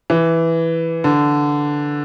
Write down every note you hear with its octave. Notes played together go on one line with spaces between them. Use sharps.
E3
D3